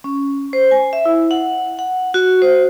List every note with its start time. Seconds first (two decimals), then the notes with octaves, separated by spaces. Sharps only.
0.04 C#4
0.53 C5
0.71 G#5
0.93 E5
1.05 E4
1.31 F#5
1.79 F#5
2.14 F#4
2.42 C5